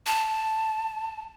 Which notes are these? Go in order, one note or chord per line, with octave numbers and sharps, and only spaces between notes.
A5